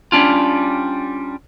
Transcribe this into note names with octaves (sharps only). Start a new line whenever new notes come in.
G3 C#4 D4 F4